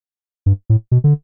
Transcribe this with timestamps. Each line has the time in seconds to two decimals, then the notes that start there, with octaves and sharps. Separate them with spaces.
0.46 G2
0.70 A2
0.91 B2
1.04 D3